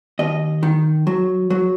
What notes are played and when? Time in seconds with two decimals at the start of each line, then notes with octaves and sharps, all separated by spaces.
0.19 D#2 D#5
0.63 D#3
1.07 F#3
1.50 F#3